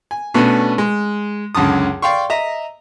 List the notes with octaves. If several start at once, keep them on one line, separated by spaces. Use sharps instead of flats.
G#5
B2 A3 B3 C#4 D4 B4
G#3
C#2 F#2 D3 A5 D#6
D5 F5 G5 C6 C#6
D#5 E5 A#5